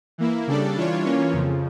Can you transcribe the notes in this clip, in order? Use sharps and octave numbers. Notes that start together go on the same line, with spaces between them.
E3 A#3 E4
C#3 G3 D4 A4 D5
E3 G3 D4 F4 C#5
E3 A#3 C#4 F4 C#5
F2 C#3 F3